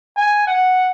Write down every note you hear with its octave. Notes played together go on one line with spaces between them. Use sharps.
G#5
F#5